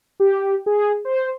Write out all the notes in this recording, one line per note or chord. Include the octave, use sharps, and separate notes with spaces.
G4
G#4
C5